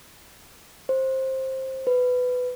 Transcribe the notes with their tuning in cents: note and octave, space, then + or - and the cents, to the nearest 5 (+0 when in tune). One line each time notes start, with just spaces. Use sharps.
C5 +15
B4 +15